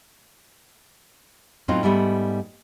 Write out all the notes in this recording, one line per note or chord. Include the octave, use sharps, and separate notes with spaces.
A2 F#3 B3 C4 D#4 F4
G#2 G3 A3 B3